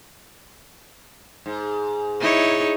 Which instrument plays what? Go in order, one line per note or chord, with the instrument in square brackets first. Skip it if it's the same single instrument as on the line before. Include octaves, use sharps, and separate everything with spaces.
[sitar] G#2
[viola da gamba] D#4 E4 C#5